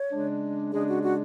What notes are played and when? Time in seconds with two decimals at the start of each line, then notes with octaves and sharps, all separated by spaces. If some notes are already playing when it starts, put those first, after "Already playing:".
Already playing: C#5
0.11 C#3 G#3 D4
0.72 C#3 G#3 D4 G#4
0.88 F#4
1.03 F#4